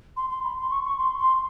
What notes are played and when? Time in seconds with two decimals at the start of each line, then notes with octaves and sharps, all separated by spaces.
0.17 C6
0.30 C6
0.44 B5
0.58 C6
0.70 C#6
0.84 C#6
0.98 C6
1.18 C6